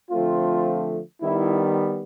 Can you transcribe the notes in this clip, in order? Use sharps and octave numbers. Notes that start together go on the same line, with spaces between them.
D3 F3 A3 C4 F4
D#3 G3 B3 E4